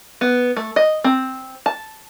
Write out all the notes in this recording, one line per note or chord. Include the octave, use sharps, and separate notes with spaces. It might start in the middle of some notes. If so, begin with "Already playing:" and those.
B3
A3
D#5
C4
A5